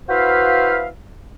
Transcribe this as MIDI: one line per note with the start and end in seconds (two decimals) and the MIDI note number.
0.09 0.88 64
0.09 0.88 66
0.09 0.88 71
0.09 0.88 72
0.09 0.88 76
0.09 0.88 77